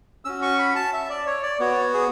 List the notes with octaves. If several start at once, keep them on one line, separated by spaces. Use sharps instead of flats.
C#4 F#4 E6
C#6
B5
A5
E5
D5
C#5
D5
B3 F#4 C#5
G#4